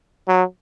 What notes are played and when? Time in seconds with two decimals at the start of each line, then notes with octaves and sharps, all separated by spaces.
0.28 F#3